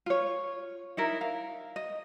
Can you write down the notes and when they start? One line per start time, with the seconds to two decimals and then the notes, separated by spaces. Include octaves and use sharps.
0.06 F4 C#5
0.97 D#4 E4 A#4
1.21 F5
1.76 D#5